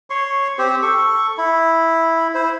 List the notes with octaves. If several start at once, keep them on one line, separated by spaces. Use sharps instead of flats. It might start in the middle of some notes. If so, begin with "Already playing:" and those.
C#5 C6 C#6
C4 G4 C5
A4 C#6
E4
E4 C5